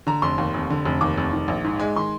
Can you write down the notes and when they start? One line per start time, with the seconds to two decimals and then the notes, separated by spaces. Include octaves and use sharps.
0.07 D3 A#5
0.22 F1 C6
0.38 D#2
0.54 F1
0.70 D3
0.85 F1
1.01 D#2 D6
1.17 F1
1.33 D#3
1.48 A#1
1.64 G#2
1.79 G#3
1.96 D#3 C6